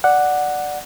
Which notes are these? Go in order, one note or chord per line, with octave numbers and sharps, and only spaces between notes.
D5 F#5